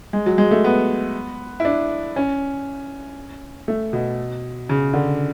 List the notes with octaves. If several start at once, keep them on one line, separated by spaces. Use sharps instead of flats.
G#3
F#3
G#3
A3
B3
E4
D4
C#4
A3
B2
C#3
D3